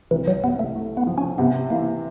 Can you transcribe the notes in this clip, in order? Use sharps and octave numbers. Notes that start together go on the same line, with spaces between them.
C2 E3
F#3
C3 B3
A3
A3
B3
F3
C#4
C3 B3
E3 A#3